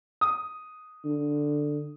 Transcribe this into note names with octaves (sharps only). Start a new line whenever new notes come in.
D#6
D3